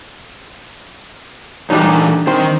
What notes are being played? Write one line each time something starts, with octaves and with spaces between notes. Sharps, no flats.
A#2 E3 G3 D4 D#4 A4
D#3 C4